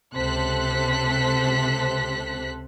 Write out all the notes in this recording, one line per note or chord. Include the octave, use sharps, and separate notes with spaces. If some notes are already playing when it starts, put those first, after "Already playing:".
C#2 C3 A4 C5 F#6 B6